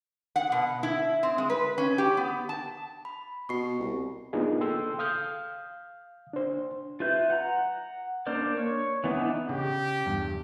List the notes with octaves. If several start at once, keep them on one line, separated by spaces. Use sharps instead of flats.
F#5
B2
E4
C4
G#3
B4
C#4
G4
B3
A5
B5
B2 C#6 C7
C2
A#3 B3 D4 D#4 F4 G#4
A4 G5 C6 E6
F5 D#6 F6 G6
D4 C5
F4 B4 E5 G6
F#5 A#5
A#3 D4 A#4 C5 D5
C#5
E3 B3 D4 D#4
C#3 G4
E2 G2